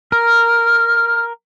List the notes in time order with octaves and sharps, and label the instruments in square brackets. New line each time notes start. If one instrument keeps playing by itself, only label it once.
[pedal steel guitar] A#4 [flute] F6